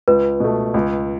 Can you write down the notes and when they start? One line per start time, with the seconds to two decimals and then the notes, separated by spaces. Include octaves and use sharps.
0.08 C#2 B4
0.40 B2 A3
0.74 C#2